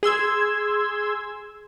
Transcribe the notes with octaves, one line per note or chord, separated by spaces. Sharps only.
G#4 C6 E6 G#6